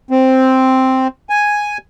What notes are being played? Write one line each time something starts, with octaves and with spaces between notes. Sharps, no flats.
C4
G#5